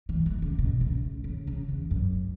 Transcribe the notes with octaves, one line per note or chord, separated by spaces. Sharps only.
E3
E3
C#3
B2
C#3
C#3
C#3
E2
F#2